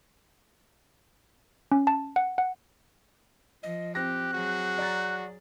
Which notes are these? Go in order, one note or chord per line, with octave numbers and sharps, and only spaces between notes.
C#4
A5
F#5
F#5
F3 D#5
C4 G4 F#6 A#6
F#3 F#4 G#4
D5 A#5 A6